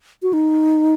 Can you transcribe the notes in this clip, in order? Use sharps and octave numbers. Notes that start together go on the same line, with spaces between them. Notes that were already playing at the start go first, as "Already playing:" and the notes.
F#4
D#4